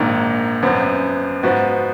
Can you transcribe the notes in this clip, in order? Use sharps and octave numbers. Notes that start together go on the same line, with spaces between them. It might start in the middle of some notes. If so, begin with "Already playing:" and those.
Already playing: A#1 G#2 D#3 A#3
G#1 F#2 F3 B3
G#2 F3 B3 F#4